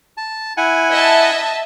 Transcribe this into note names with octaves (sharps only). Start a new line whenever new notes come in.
A5
E4 F#5 G#5
D#5 E5 A5